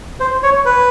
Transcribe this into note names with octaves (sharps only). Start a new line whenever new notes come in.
C5
C#5
B4